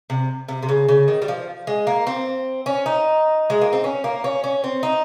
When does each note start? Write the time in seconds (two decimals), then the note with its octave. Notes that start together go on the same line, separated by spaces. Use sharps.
0.10 C3
0.48 C3
0.63 C3
0.69 C#3
0.89 C#3
1.08 D#3
1.22 G3
1.28 F3
1.67 G#3
1.87 A#3
2.07 C4
2.66 C#4
2.86 D#4
3.50 G#3
3.61 A#3
3.73 C4
3.84 C#4
4.04 A#3
4.24 C#4
4.44 C#4
4.64 C4
4.83 D#4